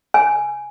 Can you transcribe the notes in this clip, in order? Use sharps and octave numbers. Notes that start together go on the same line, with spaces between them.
G#5